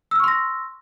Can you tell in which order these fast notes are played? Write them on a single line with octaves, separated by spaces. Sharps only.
E6 F6 C#6 C6 A#6